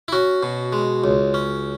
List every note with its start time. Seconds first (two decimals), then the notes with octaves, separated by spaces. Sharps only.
0.08 E4
0.12 C#4 F#4
0.43 B2
0.73 G#3
1.04 C#2
1.34 C#4